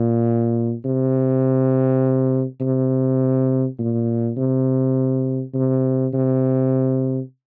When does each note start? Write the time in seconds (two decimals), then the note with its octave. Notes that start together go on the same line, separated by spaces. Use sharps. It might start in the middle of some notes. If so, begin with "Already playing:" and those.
Already playing: A#2
0.85 C3
2.61 C3
3.79 A#2
4.37 C3
5.54 C3
6.14 C3